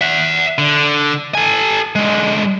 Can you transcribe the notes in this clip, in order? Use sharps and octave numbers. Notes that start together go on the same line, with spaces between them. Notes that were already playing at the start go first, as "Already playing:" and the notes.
E5 F#5
D3
A4 G#5
D3 G#3